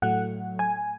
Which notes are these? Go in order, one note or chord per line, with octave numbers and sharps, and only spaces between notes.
A2 F#3 A3 F#5
G#5